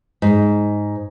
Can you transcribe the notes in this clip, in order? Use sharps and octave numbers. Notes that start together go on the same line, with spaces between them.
G#2